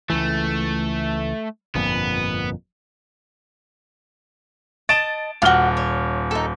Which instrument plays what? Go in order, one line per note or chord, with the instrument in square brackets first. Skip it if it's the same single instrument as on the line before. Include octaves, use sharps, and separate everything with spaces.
[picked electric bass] C#2 E3 [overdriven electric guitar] A3
[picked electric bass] G1 F2 A#2 [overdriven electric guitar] B3
[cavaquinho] D#5 A5 [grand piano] A6 D7 E7
[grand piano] D#1 F6 G7 [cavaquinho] F4 F#4
[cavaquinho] C#5
D#4 A4